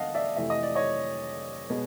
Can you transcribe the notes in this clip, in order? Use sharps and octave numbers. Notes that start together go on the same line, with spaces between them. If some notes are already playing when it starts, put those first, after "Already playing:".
Already playing: D2 D3 B3 D#5 F5 F#5 A5
D5 E5
F2 C3 E3 A3 E5
D#5
D5
C#5 D#5
B2 G#3 B3